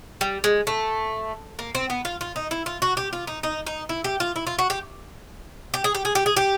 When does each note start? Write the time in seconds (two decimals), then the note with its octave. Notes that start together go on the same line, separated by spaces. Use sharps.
0.21 G3
0.44 G#3
0.67 A3
1.59 A#3
1.75 C4
1.90 B3
2.05 F4
2.21 F4
2.36 D#4
2.51 E4
2.66 F4
2.82 F#4
2.97 G4
3.13 F4
3.27 D#4
3.43 D#4
3.67 D#4
3.89 E4
4.04 G4
4.20 F4
4.36 E4
4.47 F4
4.59 F#4
4.70 G4
5.74 G4
5.84 G#4
5.95 G4
6.05 G#4
6.15 G4
6.26 G#4
6.36 G4